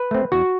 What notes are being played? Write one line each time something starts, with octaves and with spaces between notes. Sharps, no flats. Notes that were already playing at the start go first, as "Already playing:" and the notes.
Already playing: B4
A3 C4
E2 F#4